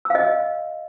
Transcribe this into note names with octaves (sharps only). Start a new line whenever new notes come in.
D#5 F5 E6